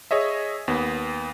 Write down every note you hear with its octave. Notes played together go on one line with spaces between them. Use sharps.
G#4 C#5 D#5 E5
D#2 B3